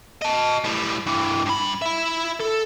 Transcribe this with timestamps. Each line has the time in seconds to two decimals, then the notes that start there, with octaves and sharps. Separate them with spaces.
0.22 D#5 A5
0.64 A2 G3
1.06 G2 E3
1.46 G2 B5
1.82 E4 E5
2.40 A4